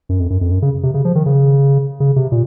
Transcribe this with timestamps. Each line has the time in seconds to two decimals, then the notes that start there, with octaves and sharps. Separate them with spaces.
0.09 F#2
0.20 F2
0.30 F#2
0.41 F2
0.51 F#2
0.62 C#3
0.83 C3
0.94 C#3
1.05 F3
1.15 D#3
1.26 C#3
2.00 C#3
2.16 C3
2.32 A#2